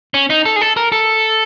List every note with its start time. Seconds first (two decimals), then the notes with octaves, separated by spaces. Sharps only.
0.14 C#4
0.30 D#4
0.45 A4
0.56 G#4
0.61 A4
0.77 A#4
0.92 A4